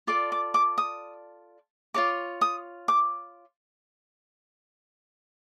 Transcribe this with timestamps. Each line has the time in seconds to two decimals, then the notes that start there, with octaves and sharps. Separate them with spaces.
0.07 F4 A4 D5 D6
0.32 D6
0.54 D6
0.78 D#6
1.94 F4 A#4 C#5 D6
2.41 D#6
2.88 D6